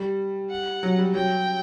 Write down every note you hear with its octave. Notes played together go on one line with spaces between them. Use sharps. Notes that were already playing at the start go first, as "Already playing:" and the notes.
Already playing: G3
F#5
F#3
G3
F#3 G5